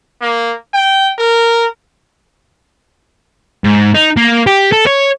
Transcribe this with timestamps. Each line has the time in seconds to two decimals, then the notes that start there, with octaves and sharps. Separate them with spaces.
0.21 A#3
0.74 G5
1.18 A#4
3.64 G#2
3.95 D#4
4.17 A#3
4.47 G4
4.72 A4
4.87 C#5